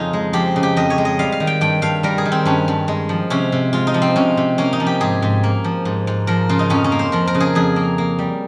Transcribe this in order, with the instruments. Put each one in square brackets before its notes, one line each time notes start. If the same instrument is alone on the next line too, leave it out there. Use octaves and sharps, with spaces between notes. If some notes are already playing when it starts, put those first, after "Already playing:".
Already playing: [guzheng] F2 C#3 C#4 D#4 F4
G#3
F3 G4
C#3
G4
F2 D#5
C#5
G#3
D#5
G3 F5
F5
D#3
G5
G2 G5
G2 F5
G3 A#4
G#4
D#3
C4
G2 C#4
G2
G#3
F3
C3 C#4
C3
G#3 F4
D#4
F3
C4
C3 C#4
C3
A#3 C#4
D#4
F3
G4
G#2 G#4
G#2
A#3
F3
G#2
G#2
F3 A#4
C#3 F4
D#4
F2 C#4
C#4
A#3
C5
F3 A#4
A#4
C#3
G#4
F2 G#4
A#3
A#3
G3